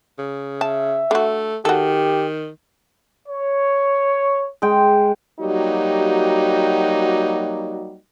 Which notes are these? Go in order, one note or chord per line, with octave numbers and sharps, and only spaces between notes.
C#3
E5 A5
D3 A3 F#4
D#3 F#4 G4 A4
C#5
G#3 G5
F#3 G3 A#3 D#4 F#4 G4